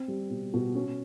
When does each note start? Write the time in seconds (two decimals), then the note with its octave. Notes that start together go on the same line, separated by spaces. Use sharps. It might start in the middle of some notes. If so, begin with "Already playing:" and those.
Already playing: C4
0.08 G3
0.30 B2
0.54 B2
0.75 C#4